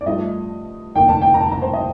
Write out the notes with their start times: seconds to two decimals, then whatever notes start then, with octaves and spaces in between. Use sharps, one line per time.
0.01 D5
0.06 G2 F3 A3 D#5
0.95 F1 D#2 D3 G5
1.09 A5
1.22 G5
1.34 A#5
1.40 A5
1.51 A#5
1.62 C5
1.73 D#5